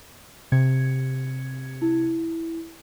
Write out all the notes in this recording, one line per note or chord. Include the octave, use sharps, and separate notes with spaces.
C3 G#6 C#7
E4